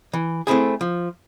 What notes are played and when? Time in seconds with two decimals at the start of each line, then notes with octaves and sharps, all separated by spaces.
0.13 E3
0.47 A3 C4 E4 G#4
0.81 F3